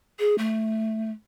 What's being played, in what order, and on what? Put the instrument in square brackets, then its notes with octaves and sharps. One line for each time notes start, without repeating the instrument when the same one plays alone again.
[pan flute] G#4
A3